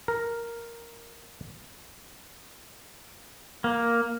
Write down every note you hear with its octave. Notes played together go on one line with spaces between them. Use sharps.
A#4
A#3